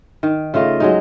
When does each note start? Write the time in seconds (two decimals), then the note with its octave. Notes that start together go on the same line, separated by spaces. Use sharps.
0.23 D#3
0.54 C#3 A3 F4 D#5
0.80 F#3 G#3 D#4